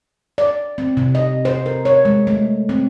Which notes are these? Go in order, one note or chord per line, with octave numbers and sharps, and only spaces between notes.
D5
C4
C3
D#5
C5
A#4
C#5
G#3
A3
C4